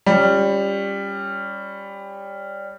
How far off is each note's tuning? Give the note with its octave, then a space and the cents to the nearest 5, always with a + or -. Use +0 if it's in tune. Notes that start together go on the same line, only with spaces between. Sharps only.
G3 +15 C#4 +0 F4 +0